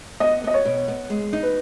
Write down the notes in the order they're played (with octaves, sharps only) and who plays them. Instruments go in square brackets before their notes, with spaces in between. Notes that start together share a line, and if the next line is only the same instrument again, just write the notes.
[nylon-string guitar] B3 [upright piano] D#5
[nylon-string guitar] B3 [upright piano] D#5
[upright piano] C#5
[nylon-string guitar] B2
B3
G#3
D#4
[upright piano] B4